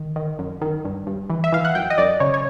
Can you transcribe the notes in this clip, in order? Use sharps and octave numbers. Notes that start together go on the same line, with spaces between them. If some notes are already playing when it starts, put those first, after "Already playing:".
Already playing: D#3
D#3
F#2
D#3
G2
G2
E3
E5
E3 F5
F#5
F#2 G5
D#5
F#2 D5
C#3 C#5
C#5